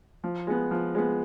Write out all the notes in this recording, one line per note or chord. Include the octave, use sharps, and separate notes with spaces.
F3
G#3 B3
F3
G#3 B3